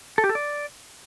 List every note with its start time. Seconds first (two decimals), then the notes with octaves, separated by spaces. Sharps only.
0.18 A4
0.24 G4
0.29 A4
0.35 D5